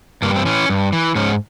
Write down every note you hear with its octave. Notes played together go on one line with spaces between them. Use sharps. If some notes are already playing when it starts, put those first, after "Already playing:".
G2 A#3
C4
E3 C#4
G2
E3
G#2 C#4